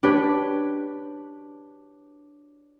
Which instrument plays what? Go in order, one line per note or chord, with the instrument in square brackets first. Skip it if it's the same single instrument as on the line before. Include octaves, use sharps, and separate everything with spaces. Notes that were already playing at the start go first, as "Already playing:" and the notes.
[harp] D4 G4 B4 C#5